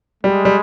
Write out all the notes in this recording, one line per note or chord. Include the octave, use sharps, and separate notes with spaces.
G3 G#3
G3